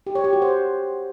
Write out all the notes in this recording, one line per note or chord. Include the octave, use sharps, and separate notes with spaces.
G4
C#5
G4
F#4
C5